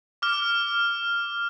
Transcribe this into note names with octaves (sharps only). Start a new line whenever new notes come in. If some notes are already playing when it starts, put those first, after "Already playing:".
D6 F6